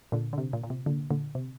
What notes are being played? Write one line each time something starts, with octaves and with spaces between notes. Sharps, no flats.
A#2 D3
D3
C3
A#2
A#2
C3
A#2 D3
A#2 D3
C3